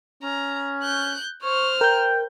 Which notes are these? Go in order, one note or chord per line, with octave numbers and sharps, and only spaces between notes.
C#4 A#5
F#6 G6
C5 C#6 F6
A#4 G5 G6